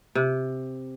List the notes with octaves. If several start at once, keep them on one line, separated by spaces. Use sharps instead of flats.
C3